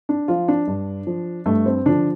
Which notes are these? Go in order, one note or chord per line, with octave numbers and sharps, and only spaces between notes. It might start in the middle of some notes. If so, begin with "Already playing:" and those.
D4
F3 F4
D4
G2
F3
G2 A3
C4
D3 F3 D4